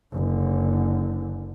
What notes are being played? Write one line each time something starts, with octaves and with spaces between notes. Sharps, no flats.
F#1 D3